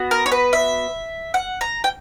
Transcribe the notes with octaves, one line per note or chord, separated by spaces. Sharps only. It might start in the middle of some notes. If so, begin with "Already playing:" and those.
Already playing: B3 F#4
A#4
C#5
B4
E5
F#5
A#5
G5